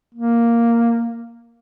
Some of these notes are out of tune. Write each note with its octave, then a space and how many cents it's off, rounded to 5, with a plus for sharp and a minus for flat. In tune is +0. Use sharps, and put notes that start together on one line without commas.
A#3 +0